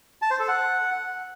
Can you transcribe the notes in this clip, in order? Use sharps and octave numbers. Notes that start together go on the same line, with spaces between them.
A5
C5
A4
F#5